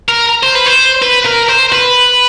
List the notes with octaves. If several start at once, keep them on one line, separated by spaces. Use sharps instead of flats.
A#4
C5
B4
C5
B4
A#4
C5
B4